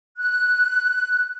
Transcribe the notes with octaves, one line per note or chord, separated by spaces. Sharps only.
F#6